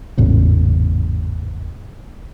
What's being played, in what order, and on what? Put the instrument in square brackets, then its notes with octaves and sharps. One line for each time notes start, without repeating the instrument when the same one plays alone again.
[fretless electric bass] G#1 E2 A2 C#3